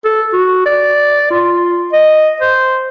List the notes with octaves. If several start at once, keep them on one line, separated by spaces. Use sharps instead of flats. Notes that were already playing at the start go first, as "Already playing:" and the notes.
A4
F#4
D5
F4
D#5
C5